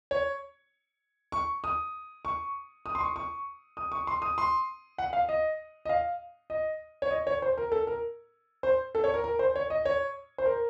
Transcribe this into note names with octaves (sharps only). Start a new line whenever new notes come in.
C#5
C#6
D#6
C#6
D#6
C6
C#6
C#6
D#6
C#6
C6
D#6
C6
F#5
F5
D#5
D#5
F5
D#5
C#5
D#5
C#5
C5
A#4
A4
A#4
C5
A4
C#5
A#4
A#4
C5
C#5
D#5
C#5
C5
A#4